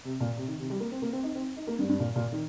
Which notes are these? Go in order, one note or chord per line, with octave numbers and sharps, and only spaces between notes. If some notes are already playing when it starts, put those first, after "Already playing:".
C3
A#2
C3
D#3
C3
G3
A#3
C4
A#3
C4
D#4
C4
D#4
A#3
G2
G2
A#2
A#2
D#3